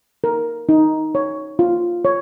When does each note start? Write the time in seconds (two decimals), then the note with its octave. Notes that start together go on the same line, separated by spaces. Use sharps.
0.24 A#4
0.69 D#4
1.15 C#5
1.59 F4
2.05 C#5